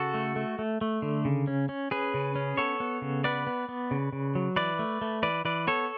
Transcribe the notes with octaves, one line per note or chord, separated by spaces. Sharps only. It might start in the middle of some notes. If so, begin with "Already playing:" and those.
Already playing: C#3 F#4 A4
A3
A3
A3
A3
D3
C#3
C#4
C#4
C#4 G#4 B4
C#3
C#4
B3 A4 C#5
B3
C#3
B3 B4 D5
B3
B3
C#3
C#3
F#3
E3 B4 D5
A3
A3
E3 B4 D5
E3 B4 D5
B3 A4 C#5